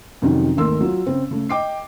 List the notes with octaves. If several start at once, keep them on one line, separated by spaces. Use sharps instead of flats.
F2 C3 D#3 F#3 C#4 D#4
G#1 D#2 A3 A#4 C6 E6
F#3 F4
C#3 C4
C#3 A3
D#5 G5 D6 C7